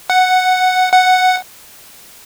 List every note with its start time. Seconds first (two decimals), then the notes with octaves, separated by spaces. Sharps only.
0.10 F#5
0.92 F#5